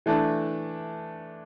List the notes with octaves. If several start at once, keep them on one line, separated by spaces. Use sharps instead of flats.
E3 A3 D4